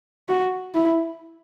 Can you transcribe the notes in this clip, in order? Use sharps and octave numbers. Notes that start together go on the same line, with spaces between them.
F#4
E4